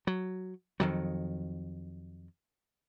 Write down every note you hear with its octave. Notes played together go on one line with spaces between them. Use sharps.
F#3
F2 D#3 F#3